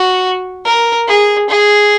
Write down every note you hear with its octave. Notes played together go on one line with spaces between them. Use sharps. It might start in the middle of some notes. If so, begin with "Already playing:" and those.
Already playing: F#4
A#4
G#4
G#4